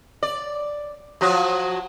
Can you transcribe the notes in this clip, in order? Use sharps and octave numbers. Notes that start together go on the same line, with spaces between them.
D5
F3 F#3 F#4